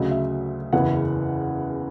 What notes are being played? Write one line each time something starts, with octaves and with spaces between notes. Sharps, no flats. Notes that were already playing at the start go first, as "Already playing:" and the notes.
Already playing: D2 C#3 F#3 D#5
E5
F#1 E2 C#3 E3 F#5